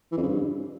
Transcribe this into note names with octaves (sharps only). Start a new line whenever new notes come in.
E3
F2
C#3
G2